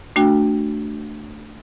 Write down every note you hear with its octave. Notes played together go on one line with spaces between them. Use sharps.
A3 D4 F#4 G5